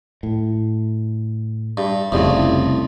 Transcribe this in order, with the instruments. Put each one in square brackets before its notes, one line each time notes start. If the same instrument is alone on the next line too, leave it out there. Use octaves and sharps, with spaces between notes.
[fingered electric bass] A2
[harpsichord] G2
[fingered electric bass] F1 C#3 [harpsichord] C2 F2 A2